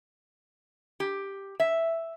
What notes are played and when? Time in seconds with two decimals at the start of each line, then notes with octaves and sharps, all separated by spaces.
1.00 G4
1.60 E5